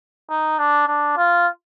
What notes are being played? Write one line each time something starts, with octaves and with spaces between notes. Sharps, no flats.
D#4
D4
D4
F4